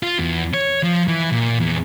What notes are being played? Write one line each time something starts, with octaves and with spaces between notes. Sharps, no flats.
F4
E2
C#5
F3
E3
A#2
E2